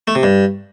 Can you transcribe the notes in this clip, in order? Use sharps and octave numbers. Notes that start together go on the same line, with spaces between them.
A3
C3
G2